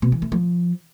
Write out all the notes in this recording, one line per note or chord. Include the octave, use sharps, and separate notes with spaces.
B2
E3
A3
F3